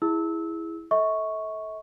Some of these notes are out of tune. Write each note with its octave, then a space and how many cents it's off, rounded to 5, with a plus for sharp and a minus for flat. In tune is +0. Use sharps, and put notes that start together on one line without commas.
E4 +0 G#4 -5 E6 -20
A4 -5 E5 -45 C#6 +0